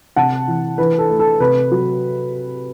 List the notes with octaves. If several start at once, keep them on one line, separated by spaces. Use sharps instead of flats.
C3 F#5 A5
E3
E3 B4
A4
A3
A4
C3 B4
F#3